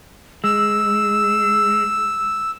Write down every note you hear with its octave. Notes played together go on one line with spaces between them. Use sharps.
G#3 E6